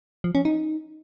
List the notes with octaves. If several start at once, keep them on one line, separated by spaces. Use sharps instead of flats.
F3
C#4
D#4